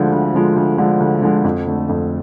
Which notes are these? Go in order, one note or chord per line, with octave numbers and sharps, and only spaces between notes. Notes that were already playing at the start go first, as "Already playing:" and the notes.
Already playing: D2 D3 F3 G#3
D2
D3 F3 G#3
D2
D3 F3 G#3
D2
D3 F3 G#3
F2
D3 A3
F2